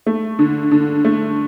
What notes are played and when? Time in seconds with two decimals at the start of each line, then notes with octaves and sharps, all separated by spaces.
0.07 A3
0.39 D3
0.71 D3
1.05 A3